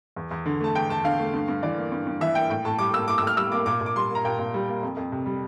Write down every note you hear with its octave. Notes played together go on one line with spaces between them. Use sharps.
E2
E2
D3
A3 A5
E2 G5
E2 A5
D3 F5
A3
G2
G2
E3 D5
A#3
G2
G2
E3 E5
A#3 G5
A2 G5
A2 A5
G3 D6
A#3 E6
A2 D6
E6
A2
F6
G3 E6
A#3 D6
A#2 D6
A#2
D6
G3 C6
A#3 A#5
A#2 G5
A#2
G3
A#3
F2
F2
C3
G3